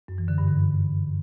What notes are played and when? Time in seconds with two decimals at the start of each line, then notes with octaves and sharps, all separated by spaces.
0.08 F#2
0.18 E3
0.28 D3
0.38 G2
0.48 D3